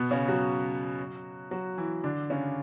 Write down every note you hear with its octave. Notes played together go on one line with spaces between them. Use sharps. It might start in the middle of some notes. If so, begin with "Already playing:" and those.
Already playing: B2 B3
C#3 C#4
F#3 F#4
F#3 F#4
E3 E4
D3 D4
C#3 C#4